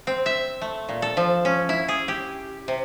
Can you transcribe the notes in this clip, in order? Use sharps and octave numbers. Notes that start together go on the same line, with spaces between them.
C4
E5
A3
A#2
A4
F3
C#4
E4
G#4
G4
C3